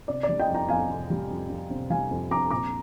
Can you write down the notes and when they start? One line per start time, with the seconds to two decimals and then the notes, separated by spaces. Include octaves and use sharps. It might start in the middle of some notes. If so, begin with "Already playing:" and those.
0.08 C3 D5
0.23 D5
0.29 G3
0.40 D#5 G5
0.49 F2
0.54 G5 A#5
0.69 F2 F5 G#5
0.90 C3
1.10 G3
1.30 F2
1.49 F2
1.70 C3
1.90 G3 F5 G#5
2.11 F2
2.31 F2 A#5 D6
2.51 A#2 A#5 D6